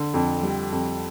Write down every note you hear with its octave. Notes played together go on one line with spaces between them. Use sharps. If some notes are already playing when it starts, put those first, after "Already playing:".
Already playing: D3
F2
G3
F2